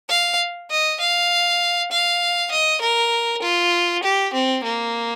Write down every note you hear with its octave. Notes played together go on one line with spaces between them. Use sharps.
F5
D#5
F5
F5
D#5
A#4
F4
G4
C4
A#3